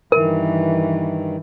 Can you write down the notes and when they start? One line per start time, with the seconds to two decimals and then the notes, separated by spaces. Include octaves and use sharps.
0.12 G2 D#3 E3 A#4